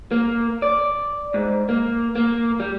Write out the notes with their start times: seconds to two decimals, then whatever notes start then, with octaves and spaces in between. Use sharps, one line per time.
0.11 A#3
0.62 D5
1.34 G#2
1.69 A#3
2.16 A#3
2.60 G3